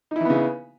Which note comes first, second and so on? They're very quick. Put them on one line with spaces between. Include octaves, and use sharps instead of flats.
D#4 E4 E3 B3 C#3